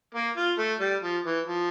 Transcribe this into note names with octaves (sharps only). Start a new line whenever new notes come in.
A#3
F4
A3
G3
F3
E3
F3